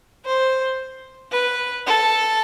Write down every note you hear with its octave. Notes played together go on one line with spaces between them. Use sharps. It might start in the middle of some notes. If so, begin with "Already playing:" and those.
C5
B4
A4